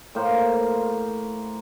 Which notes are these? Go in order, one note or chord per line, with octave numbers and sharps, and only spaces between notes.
A2 A#3 C5 F5